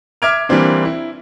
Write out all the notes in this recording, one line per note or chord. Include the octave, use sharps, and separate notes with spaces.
E5 D6 F6 G#6 D7 F7
E3 G3 A#3 C4 D4
E4